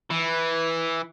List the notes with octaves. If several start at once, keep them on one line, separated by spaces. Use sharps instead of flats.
E3